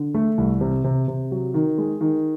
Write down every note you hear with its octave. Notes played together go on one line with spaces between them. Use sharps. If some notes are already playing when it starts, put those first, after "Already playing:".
Already playing: D3
A3
C2
C3
C3
C3
F#3
D#3
G#3
D#3